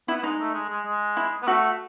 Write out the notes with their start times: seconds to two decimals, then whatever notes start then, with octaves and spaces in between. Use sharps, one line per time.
0.08 B3 E4
0.23 G#3 D#4
0.40 A3
0.54 G#3
0.70 G#3
0.86 G#3
1.17 E4
1.42 B3
1.48 A3 F#4